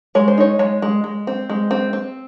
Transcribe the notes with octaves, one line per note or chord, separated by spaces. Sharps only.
G#3 C#5
C5
D#4 C#5
G#3 C#5
G#3
G#3
C4
G#3
C4
C4